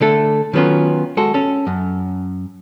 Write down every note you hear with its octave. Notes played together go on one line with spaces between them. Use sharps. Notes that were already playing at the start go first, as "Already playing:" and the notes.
D3 A3 A4
D#3 F#3 B3 C#4 F4
G#3 F#4 A4
C#4 A4
F#2